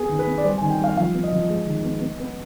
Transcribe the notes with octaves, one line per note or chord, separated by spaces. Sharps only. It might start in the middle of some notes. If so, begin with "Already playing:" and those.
Already playing: B3 G#4
D#3
B4
B3
D5
G3 C5
D#3 G#5
G5
G3 F5
F3 F5
B3
D#5
F3
G#3
D#3
B3
B3
B3